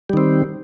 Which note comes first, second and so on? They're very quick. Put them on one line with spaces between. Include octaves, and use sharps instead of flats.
G3 D#3 C4